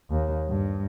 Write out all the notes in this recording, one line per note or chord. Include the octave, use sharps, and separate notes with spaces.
D#2
G2